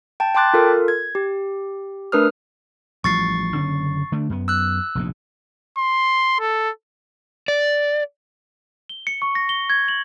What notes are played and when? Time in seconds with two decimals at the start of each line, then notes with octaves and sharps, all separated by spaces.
0.20 G5 A5
0.35 G5 A5 C6 D6 F#6 A6
0.54 F4 A4 A#4
0.88 G#6
1.15 G4
2.12 A3 D4 A#4 B4 D#6 F6
3.04 A1 F3 G3 C#6 A6 C7
3.55 F#1 D3 C#4
4.12 D3 A3 D4
4.30 F#2 B3
4.48 E6 F#6
4.95 F1 A#1 G#2
5.78 C6
6.40 A4
7.48 D5
8.89 G7
9.07 C#7
9.22 C#6
9.35 A#6
9.49 G7
9.70 G#6
9.88 F#7